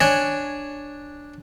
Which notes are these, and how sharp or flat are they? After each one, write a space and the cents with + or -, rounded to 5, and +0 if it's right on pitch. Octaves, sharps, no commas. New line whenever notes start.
D4 +0 C#5 +0 G#5 -5